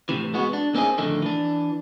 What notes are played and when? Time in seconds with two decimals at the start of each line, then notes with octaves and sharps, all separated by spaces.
0.09 A2 C3 E3
0.34 G#3 B3 F#4
0.53 D4
0.75 A#3 C4 C#4 D#4 G#4
0.98 F2 A2 D3 D#3 A3 D#4
1.22 E3 D4